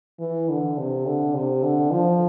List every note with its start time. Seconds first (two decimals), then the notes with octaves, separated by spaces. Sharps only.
0.20 E3
0.49 D3
0.78 C3
1.06 D3
1.35 C3
1.63 D3
1.92 F3